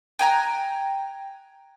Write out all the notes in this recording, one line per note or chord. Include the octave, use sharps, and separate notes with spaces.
G5 G#5 A#5 F#6